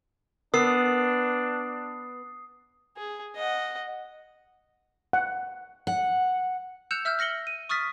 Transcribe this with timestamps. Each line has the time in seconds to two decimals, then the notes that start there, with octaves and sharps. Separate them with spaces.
0.54 B3 D4 A#4 D#6 E6 C7
2.97 G#4
3.36 D#5 F#5
5.13 F#5
5.87 F#5
6.91 E6 F#6 G6 C#7 E7 F7
7.05 E5 E6 F6 G6
7.19 F6 A#6 C#7 F#7 G7
7.47 D#7
7.69 C#6 D#6 F6 A6 B6